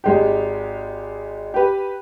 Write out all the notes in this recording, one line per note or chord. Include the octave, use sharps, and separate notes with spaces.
G#1 G#3 G4
G4 B4